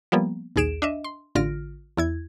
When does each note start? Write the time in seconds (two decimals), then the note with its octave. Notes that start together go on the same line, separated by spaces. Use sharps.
0.12 F3 G3 A#3 B3
0.56 A#1 D#2 G#4 D7 E7
0.82 D4 D#5 E5
1.04 C6
1.35 A1 D3 F4 F6 A#6 D7
1.97 E2 E4 G#6